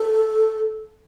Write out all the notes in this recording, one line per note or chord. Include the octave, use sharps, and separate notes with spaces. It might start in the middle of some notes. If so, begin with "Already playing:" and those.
Already playing: A4